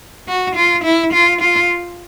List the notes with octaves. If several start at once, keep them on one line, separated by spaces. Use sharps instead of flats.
F#4
F4
E4
F4
F4